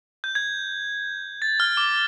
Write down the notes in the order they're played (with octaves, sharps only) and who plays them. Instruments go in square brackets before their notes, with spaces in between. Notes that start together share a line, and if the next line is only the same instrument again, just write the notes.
[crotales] G6
G#6
A6
F6
D6